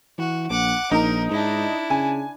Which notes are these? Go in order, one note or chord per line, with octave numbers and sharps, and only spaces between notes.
E3 F#4
A#1 F#5 D6
A#1 D#4 A#4
G#2 D4 E4
C#3 G#5